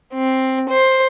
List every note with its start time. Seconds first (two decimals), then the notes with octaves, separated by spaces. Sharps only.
0.15 C4
0.69 C5